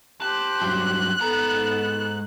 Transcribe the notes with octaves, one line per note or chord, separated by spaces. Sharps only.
G4 C5 A5 F#6
G2 F#3
G#2 B3 A4 A#5